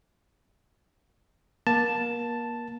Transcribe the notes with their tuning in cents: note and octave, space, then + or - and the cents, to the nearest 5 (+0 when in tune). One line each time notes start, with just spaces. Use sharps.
A#3 +30 A5 +0